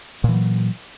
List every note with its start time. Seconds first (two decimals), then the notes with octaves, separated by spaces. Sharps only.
0.24 A#2
0.29 E3
0.33 F#3